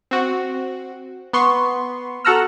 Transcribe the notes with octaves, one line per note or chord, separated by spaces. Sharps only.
C4 F#4
B3 C6 C#6
F#4 A4 F#5 A#5 E6 F6